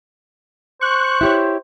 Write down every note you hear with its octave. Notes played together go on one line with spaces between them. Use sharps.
C5 C#6 F#6
E4 G4 C#5